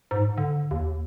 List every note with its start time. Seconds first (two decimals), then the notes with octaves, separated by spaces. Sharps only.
0.11 G#2
0.38 D3
0.71 D#2